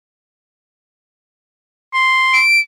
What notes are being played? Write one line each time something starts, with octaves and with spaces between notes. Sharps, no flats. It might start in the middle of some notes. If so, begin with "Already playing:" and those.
C6
D7